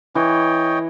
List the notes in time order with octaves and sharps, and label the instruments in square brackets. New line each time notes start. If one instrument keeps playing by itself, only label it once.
[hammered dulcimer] E3 [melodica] C#5 D#5 G5